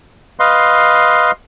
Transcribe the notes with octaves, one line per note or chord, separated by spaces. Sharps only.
B4 D#5 F5 C6